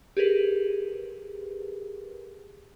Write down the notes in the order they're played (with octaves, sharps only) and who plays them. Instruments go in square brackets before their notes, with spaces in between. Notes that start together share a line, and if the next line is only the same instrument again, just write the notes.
[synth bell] G4 G#4 A#4 B4